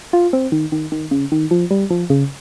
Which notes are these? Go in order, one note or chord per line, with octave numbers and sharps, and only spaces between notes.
F4
C4
D#3
D#3
D#3
C#3
D#3
F3
G3
F3
C#3